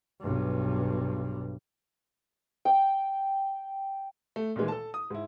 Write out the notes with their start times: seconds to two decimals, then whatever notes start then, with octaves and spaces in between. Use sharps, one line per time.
0.21 B1 G2
2.65 G5
4.36 A3
4.56 A#2 D#3 E3 G#3
4.68 A4 A5
4.94 D#6
5.10 G#2 E4